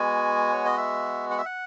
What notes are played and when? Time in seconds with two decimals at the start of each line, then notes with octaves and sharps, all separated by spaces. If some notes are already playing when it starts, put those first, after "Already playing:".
Already playing: G#3 B3 F#4 G#5
0.53 C#5
0.65 D#5
0.77 E5
1.31 F#5
1.38 E5
1.46 F#5